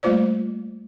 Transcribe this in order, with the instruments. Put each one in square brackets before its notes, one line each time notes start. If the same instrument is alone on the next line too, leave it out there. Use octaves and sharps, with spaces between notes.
[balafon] G3 A3 A#3 F4 C5 D5